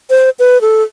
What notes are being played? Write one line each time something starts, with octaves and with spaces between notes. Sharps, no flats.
C5
B4
A4